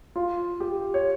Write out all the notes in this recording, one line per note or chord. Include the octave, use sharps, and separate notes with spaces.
F4
G4
C#5